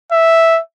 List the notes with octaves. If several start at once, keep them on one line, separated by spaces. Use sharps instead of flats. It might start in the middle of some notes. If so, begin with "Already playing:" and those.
E5